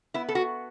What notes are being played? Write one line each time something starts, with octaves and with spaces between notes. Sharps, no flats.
B3 E4
A4
F#4